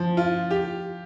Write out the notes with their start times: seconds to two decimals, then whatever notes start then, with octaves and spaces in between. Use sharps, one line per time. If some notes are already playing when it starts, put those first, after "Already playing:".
Already playing: F3
0.17 F4
0.51 G4